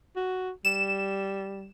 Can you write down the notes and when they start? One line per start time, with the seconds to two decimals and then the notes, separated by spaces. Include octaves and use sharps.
0.16 F#4
0.65 G3 E7